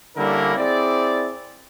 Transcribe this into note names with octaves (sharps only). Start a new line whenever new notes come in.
D3 G3 A#3 C#4 E4 A#4
C4 E4 G#4 D5